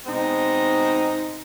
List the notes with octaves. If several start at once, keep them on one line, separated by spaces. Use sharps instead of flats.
B2 G#3 C4 D#4